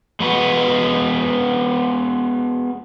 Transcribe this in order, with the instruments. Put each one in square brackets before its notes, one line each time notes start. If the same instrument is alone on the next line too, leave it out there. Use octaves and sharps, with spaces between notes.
[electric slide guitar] G#3 B3 F#4 B4